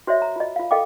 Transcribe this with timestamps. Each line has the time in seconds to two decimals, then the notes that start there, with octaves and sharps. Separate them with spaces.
0.07 F#4 C5 C#5 D#5 E5
0.22 A#5
0.36 F4 D#5
0.56 F4 F5
0.71 A4 D#5 F5 G5 D6